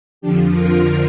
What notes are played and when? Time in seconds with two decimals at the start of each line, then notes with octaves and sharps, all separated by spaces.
0.21 F2 D3 F3 D4 G4
0.51 F4 A#4